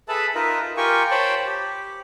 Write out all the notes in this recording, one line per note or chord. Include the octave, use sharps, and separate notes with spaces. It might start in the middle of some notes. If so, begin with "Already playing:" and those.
G#4 A4 B4 E5 A5 B5
D#4 F4 A#4 B4 D#5 E5
F4
F4 G4 A#4 G5 G#5 C#6
C5 C#5 G5 A5 B5
G4